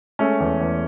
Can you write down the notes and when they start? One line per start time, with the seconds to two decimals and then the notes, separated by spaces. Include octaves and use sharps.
0.19 G#3 A3 C#4
0.40 E2
0.61 E2